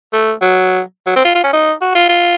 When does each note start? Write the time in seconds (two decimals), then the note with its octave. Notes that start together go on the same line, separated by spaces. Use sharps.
0.13 A3
0.42 F#3
1.06 F#3
1.16 C4
1.25 F4
1.35 F4
1.44 C#4
1.53 D#4
1.81 F#4
1.95 F4
2.09 F4